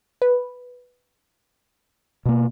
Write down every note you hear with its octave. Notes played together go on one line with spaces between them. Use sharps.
B4
B2 A#3